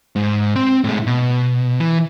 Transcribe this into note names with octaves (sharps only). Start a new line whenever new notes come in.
G#2
C4 C6
A2 G#3
B2
E3